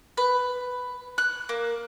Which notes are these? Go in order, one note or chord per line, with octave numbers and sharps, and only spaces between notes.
B4
F#6
A#3